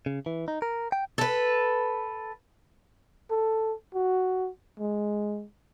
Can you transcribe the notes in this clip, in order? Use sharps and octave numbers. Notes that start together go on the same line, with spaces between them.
C#3
E3
D#4
A#4
G5
A4 B4
A4
F#4
G#3